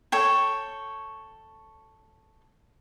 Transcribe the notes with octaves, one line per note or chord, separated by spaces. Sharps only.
A4 C#5 G5